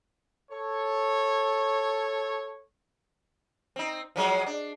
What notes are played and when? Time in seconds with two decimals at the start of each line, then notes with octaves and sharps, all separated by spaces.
0.50 A4 C#5
3.76 C4 D#4
4.16 F3 F#3 G#3
4.46 D4